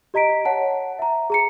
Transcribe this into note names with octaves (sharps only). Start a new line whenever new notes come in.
G4 D#5 A#5 B6 D7
C#5 F#5 A5
E5 A#5
G#4 A#5 C#7